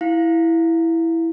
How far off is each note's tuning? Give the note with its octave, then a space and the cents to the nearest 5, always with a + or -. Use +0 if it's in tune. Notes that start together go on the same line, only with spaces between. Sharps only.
E4 +0 F5 +5